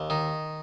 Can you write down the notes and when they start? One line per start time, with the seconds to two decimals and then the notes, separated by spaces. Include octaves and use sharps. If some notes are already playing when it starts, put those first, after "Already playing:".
Already playing: D#2
0.10 D#3